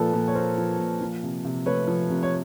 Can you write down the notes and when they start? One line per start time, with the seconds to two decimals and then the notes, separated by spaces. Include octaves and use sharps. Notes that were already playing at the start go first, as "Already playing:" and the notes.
Already playing: A#2 F3 A4 B4
0.13 A#2
0.28 C#5
0.35 A#3 A#4 C5
0.58 F3
0.79 A#2
1.01 F3
1.23 C3
1.45 C3
1.66 A3 B4 C#5
1.88 F3
2.10 C3
2.23 C#5